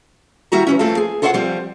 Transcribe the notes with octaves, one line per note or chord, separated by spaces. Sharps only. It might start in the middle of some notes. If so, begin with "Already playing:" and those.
D#3 G3 E4 F#4 A#5
E3 A3 C#4
F2 A3 C4 F4 A5
G#4
F4 A4 C5 C#5 D#5 F#5
F3 G3 C4